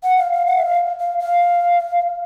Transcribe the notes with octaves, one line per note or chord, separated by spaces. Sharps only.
F#5
F5
F5
F#5
E5
F5
F5
F5